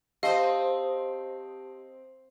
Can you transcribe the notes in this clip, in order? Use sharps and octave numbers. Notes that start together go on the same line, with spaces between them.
C4 G4 C5 D#5 F5 A5